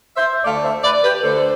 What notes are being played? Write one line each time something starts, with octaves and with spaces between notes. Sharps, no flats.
C5 E5
D2 D3 A3 D5 F5
C5 E5
B4 D5
G4 B4
D2 D3 A3 A4 C5